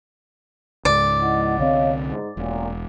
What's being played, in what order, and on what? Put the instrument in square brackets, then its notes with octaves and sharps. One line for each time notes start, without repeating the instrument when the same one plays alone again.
[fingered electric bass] C#2 G#2 [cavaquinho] D5
[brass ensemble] E4 D#5 F#5
[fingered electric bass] C2 D3 C4 [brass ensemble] C#5 D#5 F5
[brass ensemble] G#2
[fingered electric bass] E1 [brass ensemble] A1 F#2 A#2